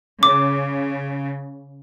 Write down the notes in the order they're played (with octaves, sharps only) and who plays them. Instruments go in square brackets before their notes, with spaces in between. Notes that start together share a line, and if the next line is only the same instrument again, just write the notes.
[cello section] C#3 [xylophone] D6